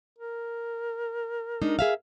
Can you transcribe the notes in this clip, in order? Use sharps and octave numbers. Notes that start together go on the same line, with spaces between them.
A#4
G#3 D4 D#4
G#4 E5 F5